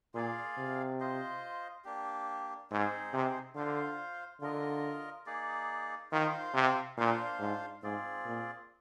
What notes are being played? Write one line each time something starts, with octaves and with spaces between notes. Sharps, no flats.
A#2 F4 G#4 D5 F5
C3
F4 C5 D#5
A#3 D4 G4
G#2 C4 D#4 G#4 C5
C3
D3 F4 C5 F5
D3 F4 A#4 D#5
A#3 D#4 G#4 D5
D#3 F4 C5 F5
C3
A#2 D4 F4 C5 F5
G#2
G#2 C4 F4 G#4 D5
A#2